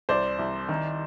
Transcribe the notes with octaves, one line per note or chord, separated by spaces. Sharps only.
C2 C5 D5
C2
D#3